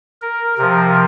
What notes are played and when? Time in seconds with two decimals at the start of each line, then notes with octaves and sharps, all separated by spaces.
0.22 A#4
0.58 C3 F3 A#4